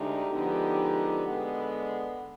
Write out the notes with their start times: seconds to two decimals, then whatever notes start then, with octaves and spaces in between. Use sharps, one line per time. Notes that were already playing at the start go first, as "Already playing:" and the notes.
Already playing: D2 D3 G#3 D#4 G4
0.32 D3 F3 G#3 B3 D#4
1.26 D3 G#3 B3